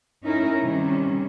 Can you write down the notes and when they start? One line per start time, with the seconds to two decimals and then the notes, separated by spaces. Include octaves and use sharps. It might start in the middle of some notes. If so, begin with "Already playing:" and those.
0.24 C#4 D#4 E4 A#4
0.58 C3 D#3 G3 C#4